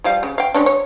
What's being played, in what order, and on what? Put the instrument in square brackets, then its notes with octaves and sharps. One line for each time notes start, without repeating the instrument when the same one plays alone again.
[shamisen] F3 G3 F5
C#3
F5 G5
G#3 C#4 D4
C#5